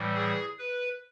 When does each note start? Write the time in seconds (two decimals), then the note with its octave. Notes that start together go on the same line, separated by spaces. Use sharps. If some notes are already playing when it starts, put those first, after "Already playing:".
Already playing: A2 E3 G3
0.15 G#4
0.59 B4